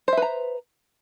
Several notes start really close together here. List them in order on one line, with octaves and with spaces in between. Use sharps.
C5 E5 B4 A#5